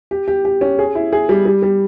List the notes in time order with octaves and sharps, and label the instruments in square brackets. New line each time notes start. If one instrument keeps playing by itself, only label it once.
[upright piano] G4
G4
G4
C#4
G#4
E4
G#4
G3
G3
G3